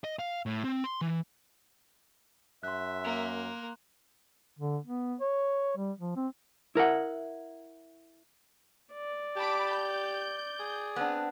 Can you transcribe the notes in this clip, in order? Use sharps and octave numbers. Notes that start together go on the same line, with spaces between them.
D#5
F5
A2
C4
C6
E3
F#2 E5 C6 F#6
A#3
D3
B3
C#5
G3
F3
C4
E4 A#4 E5 F#5
D5
G4 A5 B5 D6
G6
G#4
B3 C4 D4